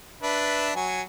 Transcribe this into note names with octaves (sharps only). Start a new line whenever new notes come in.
D4 B4 E5
F#3 G#5